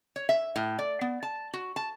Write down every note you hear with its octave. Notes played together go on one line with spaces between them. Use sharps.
C#5
E5
A2
D5
B3
A5
F#4
A5